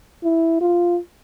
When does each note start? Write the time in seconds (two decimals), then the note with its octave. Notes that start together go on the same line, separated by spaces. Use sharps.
0.24 E4
0.61 F4